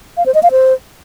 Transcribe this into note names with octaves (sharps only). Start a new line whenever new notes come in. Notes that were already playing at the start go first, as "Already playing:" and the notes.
F5
C5
D#5
F5
C5